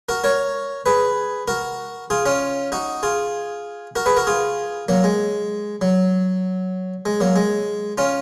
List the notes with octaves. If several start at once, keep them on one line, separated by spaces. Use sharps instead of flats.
F#4 A#4
A#4 C#5
G#4 B4
F#4 A#4
F4 G#4
C#4 F4
D#4 F#4
F4 G#4
F#4 A#4
G#4 B4
F#4 A#4
F4 G#4
F#3 A#3
G#3
F#3
G#3
F#3 A#3
G#3
C#4 F4